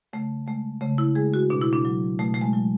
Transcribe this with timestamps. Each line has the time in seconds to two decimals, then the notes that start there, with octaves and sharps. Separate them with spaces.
0.13 C#3 A3
0.47 G#3 A3
0.81 C#3 A3
0.98 E4
1.15 G#3 G#4
1.34 F#4
1.50 B2 D4
1.62 E4
1.73 D4
1.85 F#3
2.19 B2 A3
2.34 A3
2.42 G#3
2.53 F#3